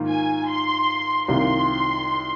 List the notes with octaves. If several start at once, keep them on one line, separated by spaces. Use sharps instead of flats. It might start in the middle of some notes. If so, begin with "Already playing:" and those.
Already playing: G#2 D#3 A#3 F4
G#5
C6
C2 C3 D#3 A#3 F4 C6